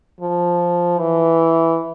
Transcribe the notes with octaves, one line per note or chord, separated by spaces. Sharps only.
F3
E3